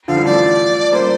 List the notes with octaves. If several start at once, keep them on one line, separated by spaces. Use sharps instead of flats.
D3 F3 F5
E3 G3
F3 A3 D5
G3 A#3 C5